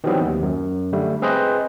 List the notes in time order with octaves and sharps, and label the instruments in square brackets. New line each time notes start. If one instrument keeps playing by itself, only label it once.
[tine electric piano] D#3 E3 F#3 G3 B3 C4
D#2
F#2
D3 G3 A3
C4 G#4 B4 C5 D#5